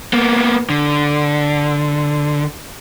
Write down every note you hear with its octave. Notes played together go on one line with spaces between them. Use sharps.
A#3 B3
D3